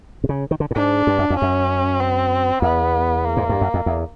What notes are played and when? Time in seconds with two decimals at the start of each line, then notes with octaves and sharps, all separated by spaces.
0.24 C3
0.29 C#3
0.51 D#3
0.60 D3
0.71 A2
0.76 G#2 D4
1.07 G2
1.19 F#2
1.30 F2
1.38 F#2 C#4
2.00 C4
2.62 E2 B3
3.25 A#3
3.37 G#2
3.49 G2
3.61 F#2
3.74 F2
3.86 E2